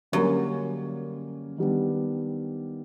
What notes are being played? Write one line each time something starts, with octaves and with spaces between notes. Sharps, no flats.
F#2 D3 G3 A#3 C#4
D#3 G3 B3 D4